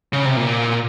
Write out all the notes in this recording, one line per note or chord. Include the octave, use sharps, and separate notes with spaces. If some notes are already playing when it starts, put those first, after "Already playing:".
C#3
C3
A#2